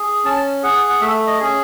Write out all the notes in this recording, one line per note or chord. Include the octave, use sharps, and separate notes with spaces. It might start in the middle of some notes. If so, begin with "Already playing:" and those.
Already playing: G#4
C#4 A5
G#4 F#5
F#5
A3 E5
D#5
C#4 G#4